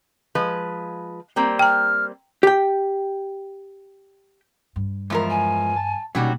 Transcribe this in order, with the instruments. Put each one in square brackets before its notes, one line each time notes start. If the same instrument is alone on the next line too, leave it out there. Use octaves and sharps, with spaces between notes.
[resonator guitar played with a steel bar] F3 G#3 B4
G3 A#3 C4
[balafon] G5 A#5 [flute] F6
[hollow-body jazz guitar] G4 G5
[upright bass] G2
[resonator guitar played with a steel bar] E2 F3 A#4 [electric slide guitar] G#3
[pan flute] G#5
[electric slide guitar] A5
[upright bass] B2 A#3 [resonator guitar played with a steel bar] F#3 G3 F#4 [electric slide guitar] C#4 D#4